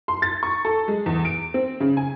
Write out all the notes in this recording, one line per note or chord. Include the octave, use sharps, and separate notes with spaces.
C6
A6
C#6
A4
G#3
E2
D7
C4
C#3
G#5